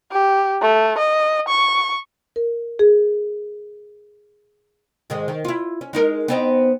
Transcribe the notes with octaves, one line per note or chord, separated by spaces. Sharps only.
G4
A3
D#5
C#6
A#4
G#4
G#2 D#3 G#3
D#3
E4 F4
C#4
G#3 D#4 A#4
B3 C4 D#4